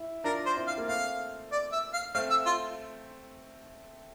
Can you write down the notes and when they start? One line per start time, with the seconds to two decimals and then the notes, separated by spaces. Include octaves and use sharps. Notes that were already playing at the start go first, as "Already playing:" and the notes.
Already playing: E4
0.24 D4 F4 A#4
0.46 C5
0.56 C4 E4
0.67 F5
0.78 A#3
0.88 A3 C4 F5
1.51 D5
1.72 E5
1.93 F5
2.15 A3 C4 F5
2.30 E5
2.46 F4